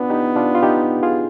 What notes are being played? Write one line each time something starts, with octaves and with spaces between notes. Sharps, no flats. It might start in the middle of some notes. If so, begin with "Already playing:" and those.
Already playing: B3 D4 F4
D#4 G4
D4 F4
F4
D#4 G4
F4 G#4